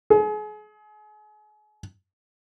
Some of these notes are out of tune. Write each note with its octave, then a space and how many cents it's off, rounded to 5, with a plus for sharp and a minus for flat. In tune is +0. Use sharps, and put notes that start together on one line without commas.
G#4 +35